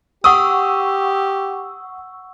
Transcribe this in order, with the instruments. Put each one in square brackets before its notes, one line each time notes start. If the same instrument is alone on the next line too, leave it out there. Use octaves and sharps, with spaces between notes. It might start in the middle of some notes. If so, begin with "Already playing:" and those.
[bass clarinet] G4 [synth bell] F#5 C#6 E6 [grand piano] D#6